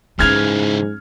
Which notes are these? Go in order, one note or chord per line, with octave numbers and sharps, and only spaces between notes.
G#2 C#3 E3 G#3 C#4 F6 G#6 F7